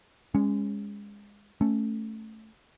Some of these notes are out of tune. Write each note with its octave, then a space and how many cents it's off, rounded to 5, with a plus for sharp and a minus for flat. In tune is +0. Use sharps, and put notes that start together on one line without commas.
G#3 -20 C#4 +0
A3 +0 C#4 +0